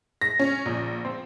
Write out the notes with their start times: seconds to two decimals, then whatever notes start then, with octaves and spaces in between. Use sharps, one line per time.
0.21 A#6
0.39 C#4
0.66 A#1
1.05 C4